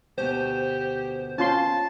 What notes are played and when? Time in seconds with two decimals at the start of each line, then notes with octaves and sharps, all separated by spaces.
0.18 D2 B2 B3 G4 C5
1.38 C#4 F4 A5 C6